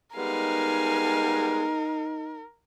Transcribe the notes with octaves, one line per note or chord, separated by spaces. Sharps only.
G3 G#3 B3 D#4 A#4 F5 G#5